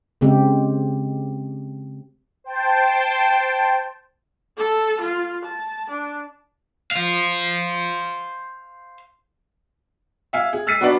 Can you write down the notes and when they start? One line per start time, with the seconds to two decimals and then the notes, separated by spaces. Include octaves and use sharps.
0.21 C#3 G#3 C4 G4
2.44 C5 G5 A5
4.57 A4
5.00 F4
5.45 A5
5.89 D4
6.91 C5 F5
10.33 E5 F5 G#5
10.53 G#4
10.67 E6 F6 A6 B6 C7 D#7
10.81 F#3 B3 D4 F#4 B4 D5